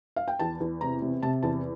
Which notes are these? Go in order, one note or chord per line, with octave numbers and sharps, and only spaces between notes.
F5
G5
E2 A5
E2
C3 A#5
C3
C3 A5
E2 A5